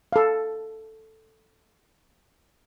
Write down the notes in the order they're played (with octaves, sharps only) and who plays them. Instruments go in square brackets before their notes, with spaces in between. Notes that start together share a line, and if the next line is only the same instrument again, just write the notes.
[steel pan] A4 F5